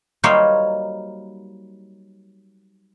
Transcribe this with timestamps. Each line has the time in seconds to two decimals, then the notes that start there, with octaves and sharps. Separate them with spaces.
0.23 F#3 G3 A#3 D#4 C5 C#5